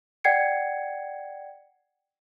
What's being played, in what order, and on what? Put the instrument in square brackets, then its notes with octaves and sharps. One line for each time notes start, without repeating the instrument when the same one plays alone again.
[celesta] D5 F#5 G5 G#6 C7 C#7